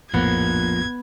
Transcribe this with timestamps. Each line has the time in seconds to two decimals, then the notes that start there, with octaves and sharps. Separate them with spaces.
0.14 A#1 F2 A2 F3 A#3 B3 G#6